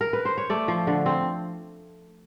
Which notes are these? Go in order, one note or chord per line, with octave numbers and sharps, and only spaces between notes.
A#4
B4
C5
C#5
A3 D5
F3
D3
C4